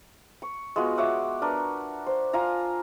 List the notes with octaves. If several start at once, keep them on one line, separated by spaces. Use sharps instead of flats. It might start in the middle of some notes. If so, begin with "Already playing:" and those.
C#6
G#3 B3 F4 F#4
C#5 E5 F#5 D6
D4 A#4 B4
C5
F4 F5 G#5 A#5